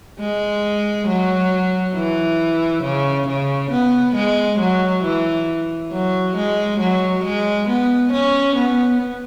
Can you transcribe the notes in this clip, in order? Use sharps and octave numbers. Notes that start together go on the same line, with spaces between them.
G#3
F#3
E3
C#3
C#3
B3
G#3
F#3
E3
F#3
G#3
F#3
G#3
B3
C#4
B3